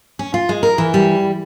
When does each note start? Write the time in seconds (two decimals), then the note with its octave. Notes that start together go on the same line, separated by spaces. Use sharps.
0.19 C#4
0.34 F4
0.49 G#3
0.63 A#4
0.78 E3
0.94 G3